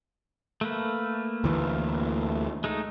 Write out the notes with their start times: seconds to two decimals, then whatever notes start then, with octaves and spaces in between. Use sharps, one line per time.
0.61 A3 A#3 B4
1.44 D2 E3
2.64 G#3 A3 D#4